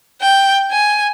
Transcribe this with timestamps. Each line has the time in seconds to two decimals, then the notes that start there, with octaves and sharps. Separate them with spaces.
0.22 G5
0.71 G#5